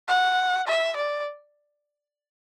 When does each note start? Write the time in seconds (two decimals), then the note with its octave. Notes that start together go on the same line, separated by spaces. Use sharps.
0.08 F#5
0.67 E5
0.96 D5